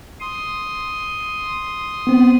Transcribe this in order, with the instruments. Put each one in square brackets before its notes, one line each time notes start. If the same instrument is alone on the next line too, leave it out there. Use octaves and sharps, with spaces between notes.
[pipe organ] C6 D#6
[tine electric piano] B3 C4